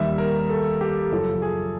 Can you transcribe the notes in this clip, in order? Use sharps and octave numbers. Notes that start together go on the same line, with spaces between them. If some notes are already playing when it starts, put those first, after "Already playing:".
Already playing: D#2 D#3 G3 E5
A#4
A4
G4
F#2 C#3 F3 A4
G#4